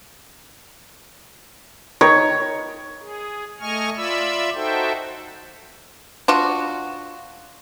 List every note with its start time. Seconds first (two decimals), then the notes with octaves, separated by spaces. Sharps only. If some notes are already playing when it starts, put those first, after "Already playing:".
2.01 D#3 C#5
3.00 G#4
3.60 A3 D#5 G#5 C#6 F6
3.96 F4 D5 E5 B5 E6
4.55 D#4 F#4 A4 C5 E5 G5
6.28 D4 F4 F#4